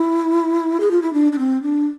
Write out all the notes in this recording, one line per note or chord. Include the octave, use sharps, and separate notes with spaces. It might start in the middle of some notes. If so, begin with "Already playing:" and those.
Already playing: E4
G#4
F4
E4
D4
D4
C4
D4